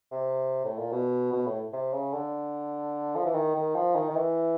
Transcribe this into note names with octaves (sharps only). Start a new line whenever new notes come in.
C3
A2
A#2
B2
B2
A2
C3
C#3
D3
F3
E3
D#3
D#3
F3
D#3
D#3
E3